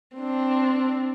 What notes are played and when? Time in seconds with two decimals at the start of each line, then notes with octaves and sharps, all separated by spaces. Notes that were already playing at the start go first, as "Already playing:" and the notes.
0.16 C4 D4